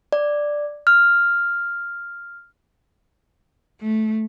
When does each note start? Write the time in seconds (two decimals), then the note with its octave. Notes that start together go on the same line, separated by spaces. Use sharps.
0.13 D5
0.87 F6
3.81 A3